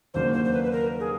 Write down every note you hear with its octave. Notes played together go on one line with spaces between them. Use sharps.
D#2 C#3 F#3 A#3 D4 C5
C5
C5
B4
B4
A#4
G#4